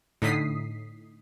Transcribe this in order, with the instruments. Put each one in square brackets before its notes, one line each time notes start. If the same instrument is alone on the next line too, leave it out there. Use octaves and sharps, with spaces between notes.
[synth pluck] A2 D3 D#4 D#6 B6 C7